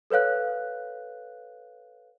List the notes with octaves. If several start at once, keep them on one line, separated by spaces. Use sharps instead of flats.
A4 B4 C#5 F5 F#6